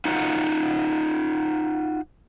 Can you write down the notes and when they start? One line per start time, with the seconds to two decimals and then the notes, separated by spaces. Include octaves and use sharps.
0.05 D#4 F4 F#4 F#5